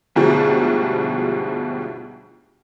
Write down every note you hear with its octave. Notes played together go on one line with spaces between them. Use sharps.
G1 D2 G#2 B2 F3 G3